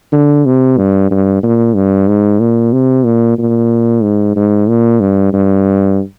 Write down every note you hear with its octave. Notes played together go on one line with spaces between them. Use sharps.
D3
C3
G2
G2
A#2
G2
G#2
A#2
C3
A#2
A#2
G#2
G#2
A#2
G2
G2